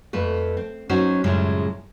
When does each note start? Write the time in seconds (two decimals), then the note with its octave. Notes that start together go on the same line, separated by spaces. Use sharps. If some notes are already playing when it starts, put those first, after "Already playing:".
0.13 F2 A3 B4
0.57 C4
0.89 F#3 C#4 D#4 F#4 C5
1.24 F#2 A2 C#3 F3 G3 G#3